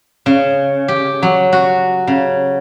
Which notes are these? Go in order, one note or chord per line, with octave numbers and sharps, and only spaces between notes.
C#3
G4
F#3
F#4
C#3